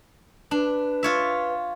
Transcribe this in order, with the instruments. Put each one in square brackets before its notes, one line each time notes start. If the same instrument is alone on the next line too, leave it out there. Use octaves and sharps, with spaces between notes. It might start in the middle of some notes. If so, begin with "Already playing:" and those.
[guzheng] D4 [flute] B4
[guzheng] F4 C#5 E5